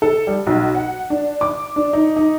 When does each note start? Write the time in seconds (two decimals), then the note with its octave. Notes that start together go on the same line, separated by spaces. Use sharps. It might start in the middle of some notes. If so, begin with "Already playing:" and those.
0.02 A4
0.27 G3
0.47 B1
0.75 F#5
1.10 D4
1.41 D6
1.76 D4
1.93 D#4
2.16 D#4